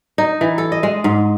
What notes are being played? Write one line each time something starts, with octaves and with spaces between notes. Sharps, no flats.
D#4
E3
A4
D#5
G#3
G#2